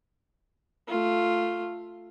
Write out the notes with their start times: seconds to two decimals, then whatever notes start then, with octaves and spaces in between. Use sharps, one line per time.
0.88 A3 F4